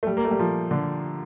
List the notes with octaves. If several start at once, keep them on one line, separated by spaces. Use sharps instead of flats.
A3
G3
A#3
A3
G3
F3
D3